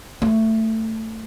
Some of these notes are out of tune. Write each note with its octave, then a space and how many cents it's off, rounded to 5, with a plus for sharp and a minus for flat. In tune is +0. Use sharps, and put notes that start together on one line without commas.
A3 +15